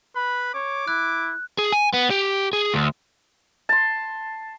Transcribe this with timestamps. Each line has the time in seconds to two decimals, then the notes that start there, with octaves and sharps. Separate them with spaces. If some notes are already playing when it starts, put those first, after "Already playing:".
0.16 B4 B5
0.54 C#5 D6
0.88 E4 F#6
1.58 G#4
1.72 G#5
1.94 B3
2.10 G4
2.53 G#4
2.74 D2
3.69 A5 C6